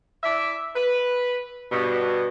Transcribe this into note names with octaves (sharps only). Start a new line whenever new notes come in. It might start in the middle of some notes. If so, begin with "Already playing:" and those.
E4 D5 E5
B4
G2 B2